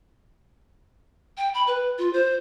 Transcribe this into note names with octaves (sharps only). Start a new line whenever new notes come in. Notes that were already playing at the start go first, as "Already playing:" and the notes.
G5
B5
B4
F4
C5